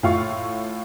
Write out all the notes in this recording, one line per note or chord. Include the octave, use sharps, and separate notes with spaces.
A2 F4 F5 C#6